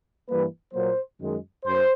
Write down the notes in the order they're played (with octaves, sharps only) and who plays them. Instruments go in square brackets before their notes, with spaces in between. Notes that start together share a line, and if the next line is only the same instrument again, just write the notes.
[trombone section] G2 E3 G3 A#3 B4
A#2 F#3 A#3 C5
F#2 D#3 G#3
F#2 C5